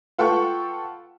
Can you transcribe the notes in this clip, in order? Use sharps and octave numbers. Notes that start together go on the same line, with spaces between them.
F4 A4 B4 F#5 G5 C#6